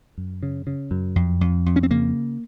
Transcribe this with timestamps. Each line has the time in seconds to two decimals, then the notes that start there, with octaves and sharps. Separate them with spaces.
0.18 F#2
0.43 C#3
0.67 C#3
0.91 F#2
1.16 F2
1.41 F2
1.66 F2
1.76 C#4
1.83 C4
1.91 C#3 A#3